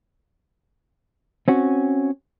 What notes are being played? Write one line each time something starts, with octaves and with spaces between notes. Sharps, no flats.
C4 C#4 F#4